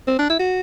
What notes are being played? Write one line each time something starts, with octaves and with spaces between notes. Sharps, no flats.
C4
D4
E4
F#4